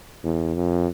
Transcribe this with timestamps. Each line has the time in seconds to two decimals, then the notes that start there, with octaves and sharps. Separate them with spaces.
0.24 E2
0.55 F2